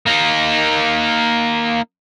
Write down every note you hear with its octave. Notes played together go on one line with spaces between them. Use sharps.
A#3 D#4